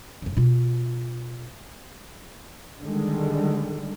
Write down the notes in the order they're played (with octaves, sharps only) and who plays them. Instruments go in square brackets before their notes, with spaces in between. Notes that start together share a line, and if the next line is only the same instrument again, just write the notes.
[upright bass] F2 C#3
B2 F4
[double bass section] D3 D#3 G3 G#3